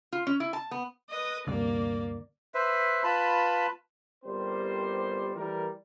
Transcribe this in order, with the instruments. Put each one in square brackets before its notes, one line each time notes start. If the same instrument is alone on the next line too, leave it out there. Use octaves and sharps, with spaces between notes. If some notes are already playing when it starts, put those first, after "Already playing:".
[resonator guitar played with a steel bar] F4
C#4
E4
A5
B3
[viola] B4 D#5
[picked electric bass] D2 G2 C3 [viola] A#3 D5
[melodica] B4 C5 E5
F4 B4 A5 B5
[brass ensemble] G1 G3 C4 G4 A#4 C5
E3 G3 A3 A#4